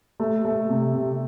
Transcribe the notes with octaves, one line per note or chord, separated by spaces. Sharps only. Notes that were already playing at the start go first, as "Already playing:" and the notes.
A3
A3
C3
C3